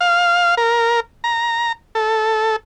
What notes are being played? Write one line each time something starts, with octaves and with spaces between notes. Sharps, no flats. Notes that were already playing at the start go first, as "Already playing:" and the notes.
F5
A#4
A#5
A4